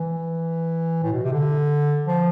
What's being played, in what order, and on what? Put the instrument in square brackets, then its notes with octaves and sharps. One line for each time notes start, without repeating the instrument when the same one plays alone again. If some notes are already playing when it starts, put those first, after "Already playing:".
Already playing: [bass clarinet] E3
A2
B2
C3
D3
F3